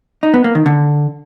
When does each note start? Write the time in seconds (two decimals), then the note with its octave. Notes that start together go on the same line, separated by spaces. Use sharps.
0.23 D#4
0.34 B3
0.44 A#3
0.55 D#3
0.66 D3